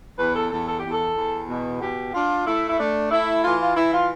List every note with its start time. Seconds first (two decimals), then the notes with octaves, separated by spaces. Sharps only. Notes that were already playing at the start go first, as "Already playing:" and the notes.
0.18 E2 B4
0.35 A4
0.51 E2 A4
0.67 A4
0.79 E2 G4
0.91 A4
1.16 E2
1.48 B2
1.81 B2 G4
2.14 D4 F4
2.46 A3 E4
2.69 E4
2.79 A3 D4
3.11 A3 E4
3.43 E3 F4
3.60 F4
3.76 E3 E4
3.93 F4